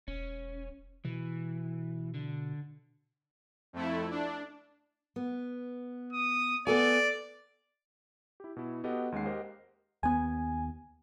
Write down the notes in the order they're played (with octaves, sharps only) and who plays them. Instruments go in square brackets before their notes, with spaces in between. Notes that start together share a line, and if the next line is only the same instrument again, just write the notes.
[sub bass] E1 [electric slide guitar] C#4
[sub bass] B2 [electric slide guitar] E3
[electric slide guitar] D3
[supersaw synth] F2 A3 E4
D4
[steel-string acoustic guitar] B3
[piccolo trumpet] D#6
[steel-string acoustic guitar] B3 A4 G#5 [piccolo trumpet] D5
[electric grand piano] E4 G4
B2 E4
B3 F#4 G4 A4 D#5 F#5
D#2 G#3 C#4 F#5 C7
G4 A#4 C5 D#5 F5 F#5
[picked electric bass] D#2 B3 [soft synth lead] G#5